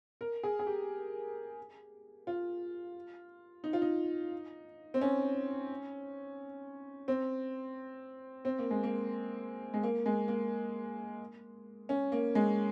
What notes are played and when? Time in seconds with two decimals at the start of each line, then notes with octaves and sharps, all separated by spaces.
0.21 A#4
0.43 G#4
0.59 G#4
0.67 G4
2.27 F4
3.64 D#4
3.73 F4
3.82 D#4
4.94 C4
5.01 C#4
7.08 C4
8.45 C4
8.59 A#3
8.71 G#3
8.83 A#3
9.74 G#3
9.83 A#3
10.06 G#3
10.28 A#3
11.89 C#4
12.12 A#3
12.35 G#3